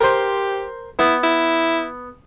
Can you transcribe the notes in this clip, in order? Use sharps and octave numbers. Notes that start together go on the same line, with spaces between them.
G4 A#4 C5
B3 E4
E4